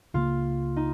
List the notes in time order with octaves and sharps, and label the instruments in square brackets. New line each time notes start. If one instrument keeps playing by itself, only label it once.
[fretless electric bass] C#2 C#3 F#3 A#3 [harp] F4
[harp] D#4